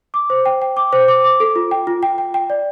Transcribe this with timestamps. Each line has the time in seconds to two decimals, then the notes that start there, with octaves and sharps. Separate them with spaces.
0.14 D6
0.30 C5
0.46 G5
0.62 G5
0.77 D6
0.93 C5
1.08 D6
1.24 D6
1.40 A4
1.56 F4
1.71 G5
1.87 F4
2.03 G5
2.18 G5
2.34 G5
2.50 D5